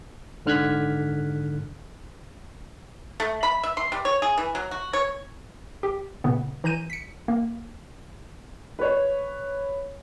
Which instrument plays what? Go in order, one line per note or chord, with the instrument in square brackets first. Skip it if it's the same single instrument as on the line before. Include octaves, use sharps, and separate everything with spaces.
[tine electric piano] G#2 D3 F6 F#6 G#6 B6
[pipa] A3
B5
E5
C6
G3
C#5
G#4
E3
F#3
F#4
C#5
[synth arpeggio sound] G4
A#2 C#3 B3
E3 A#5 G6 D#7
B6 C#7
A#3
[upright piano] B4 C#5